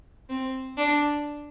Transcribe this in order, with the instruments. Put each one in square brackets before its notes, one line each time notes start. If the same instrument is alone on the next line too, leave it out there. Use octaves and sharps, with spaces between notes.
[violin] C4
D4